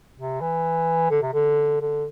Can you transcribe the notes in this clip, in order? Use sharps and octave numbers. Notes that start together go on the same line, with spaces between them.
C3
E3
D3
C3
D3
D3